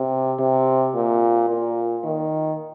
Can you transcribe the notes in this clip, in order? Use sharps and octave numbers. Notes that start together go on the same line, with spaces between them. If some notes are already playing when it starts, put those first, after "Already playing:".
Already playing: C3
C3
A#2
A#2
D#3